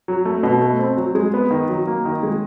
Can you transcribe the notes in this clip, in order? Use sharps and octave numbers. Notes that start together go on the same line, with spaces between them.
F#3
A3
B2
A3
C4
F#3
G#3
B3
D#3
F#3
A#3
D#3
G#3